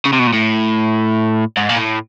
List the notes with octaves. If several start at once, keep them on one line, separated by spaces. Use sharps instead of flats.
C#3
C3
B2
A#2
A2
G#2
A#2
A2